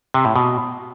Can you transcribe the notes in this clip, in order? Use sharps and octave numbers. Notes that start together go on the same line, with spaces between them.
C3
A2
B2